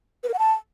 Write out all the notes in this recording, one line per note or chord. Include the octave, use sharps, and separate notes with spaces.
B4
A#4
F#5
A5